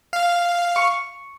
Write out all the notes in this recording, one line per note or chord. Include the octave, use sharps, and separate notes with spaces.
F5
C#6